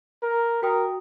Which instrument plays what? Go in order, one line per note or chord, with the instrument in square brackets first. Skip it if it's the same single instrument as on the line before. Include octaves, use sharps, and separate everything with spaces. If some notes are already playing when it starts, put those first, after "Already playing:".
[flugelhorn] A#4
[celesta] F#4 G5 D#6 [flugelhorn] A#4